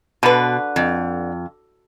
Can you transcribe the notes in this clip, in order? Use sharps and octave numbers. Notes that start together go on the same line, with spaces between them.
B2 D3 B4
F2